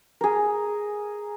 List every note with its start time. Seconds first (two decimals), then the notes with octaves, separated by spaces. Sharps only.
0.21 G#4 A#4